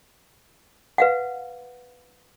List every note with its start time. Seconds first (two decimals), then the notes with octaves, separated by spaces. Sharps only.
0.98 B4 F5 F#5